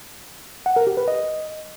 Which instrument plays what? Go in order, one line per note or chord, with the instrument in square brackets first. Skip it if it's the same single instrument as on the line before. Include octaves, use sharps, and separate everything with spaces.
[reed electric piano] F#5
A#4
G4
B4
D#5